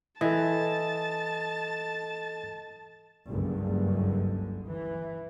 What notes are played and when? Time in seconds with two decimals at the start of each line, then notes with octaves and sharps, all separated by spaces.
0.21 E3 A4 D#5 A5
3.30 F#1 C#2 G2 D3
4.67 E3